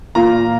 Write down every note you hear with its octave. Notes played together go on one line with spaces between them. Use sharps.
A#2 A#3 F4 A#5